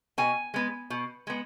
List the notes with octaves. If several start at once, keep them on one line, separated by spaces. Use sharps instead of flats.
B2 G#5
G#3 B3
B2
G#3 B3